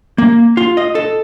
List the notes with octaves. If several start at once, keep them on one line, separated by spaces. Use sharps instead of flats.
A#3
F4
D#5
A4